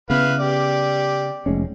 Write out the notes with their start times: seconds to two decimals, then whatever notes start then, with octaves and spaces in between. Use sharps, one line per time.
0.10 C#3 B3 E4 B4 F5
0.40 G4 D5
1.46 F1 G#3 C#4